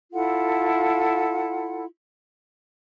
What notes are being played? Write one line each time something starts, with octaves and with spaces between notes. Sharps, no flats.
E4 F4 A4 F#5